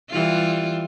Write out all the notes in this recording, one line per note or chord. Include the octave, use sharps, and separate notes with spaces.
E3 G3 F4